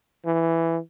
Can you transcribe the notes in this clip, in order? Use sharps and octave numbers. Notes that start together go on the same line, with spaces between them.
E3